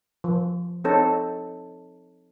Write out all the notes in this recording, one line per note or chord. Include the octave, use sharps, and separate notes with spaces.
F3
C4 D#4 A4 C#5